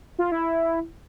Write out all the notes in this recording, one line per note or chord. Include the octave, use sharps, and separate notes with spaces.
F4
E4